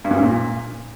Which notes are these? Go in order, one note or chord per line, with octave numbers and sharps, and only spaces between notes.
G2
F#2
G#2
A#2